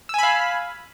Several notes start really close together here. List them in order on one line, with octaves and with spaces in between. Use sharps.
E6 G#5 B5 F5